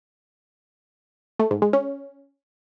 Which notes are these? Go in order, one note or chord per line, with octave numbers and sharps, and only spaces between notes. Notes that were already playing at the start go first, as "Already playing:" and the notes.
A3
G#2
G#3
C#4